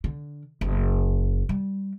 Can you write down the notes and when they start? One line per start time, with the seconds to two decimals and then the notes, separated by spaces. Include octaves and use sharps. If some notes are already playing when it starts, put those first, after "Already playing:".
0.04 D3
0.61 F#1
1.49 G3